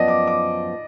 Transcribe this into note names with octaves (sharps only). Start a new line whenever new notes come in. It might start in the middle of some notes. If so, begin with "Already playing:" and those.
Already playing: F#2 F3 B3 D5 D#5
D6
D6